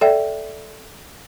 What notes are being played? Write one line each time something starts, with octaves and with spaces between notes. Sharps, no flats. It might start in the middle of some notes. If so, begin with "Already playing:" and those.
A4 D5 E5 G5